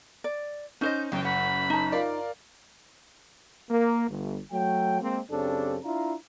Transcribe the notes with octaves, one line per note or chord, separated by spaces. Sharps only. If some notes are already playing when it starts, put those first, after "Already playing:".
D5
C#4 D#4 C5 D#5 G6
F#1 F#2 G5
F#5 B5
D#4 A5
F4 A#4 D5
A#3
G1
F#3 A3 G5
G#3 A#3 C4
F#2 C#3 C4 D4 G4 A4
D4 E4 F4 F5 A#5